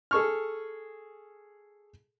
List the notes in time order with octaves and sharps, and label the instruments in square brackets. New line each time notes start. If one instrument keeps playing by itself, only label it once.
[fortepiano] G#4 A4 C#6 F6